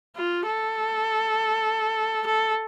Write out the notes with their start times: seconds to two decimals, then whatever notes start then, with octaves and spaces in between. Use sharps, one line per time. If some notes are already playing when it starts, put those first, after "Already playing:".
0.16 F4
0.46 A4
2.26 A4